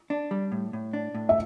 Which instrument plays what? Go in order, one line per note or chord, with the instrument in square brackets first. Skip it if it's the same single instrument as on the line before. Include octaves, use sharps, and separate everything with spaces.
[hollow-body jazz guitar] D4
G3
A2
A2
D4
A2
[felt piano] E5